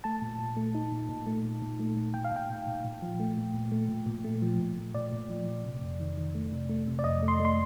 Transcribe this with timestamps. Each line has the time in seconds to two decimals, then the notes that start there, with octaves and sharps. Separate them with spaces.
0.04 A3 A5
0.22 A#2
0.39 A#2
0.57 A3
0.75 D#4
0.92 A#2
1.09 A#2
1.27 A3
1.44 A#2
1.62 A#2
1.79 A3
1.97 A3
2.14 A#2 G5
2.24 F5
2.32 A#2 G5
2.50 A#2
2.67 A#2
2.84 A#2
3.02 F3
3.20 A3
3.37 A#2
3.54 A#2
3.71 A3
3.89 A#2
4.06 A#2
4.24 A3
4.42 F3
4.60 A#2
4.77 A#2
4.94 A#2 D5
5.12 A#2
5.30 F3
5.47 F3
5.65 C3
5.82 F2
6.00 D#3
6.18 D#3
6.35 A3
6.52 C3
6.69 A3
6.88 C3
6.99 D5
7.04 F2 D#5
7.23 A3
7.28 C6
7.40 A3
7.45 C6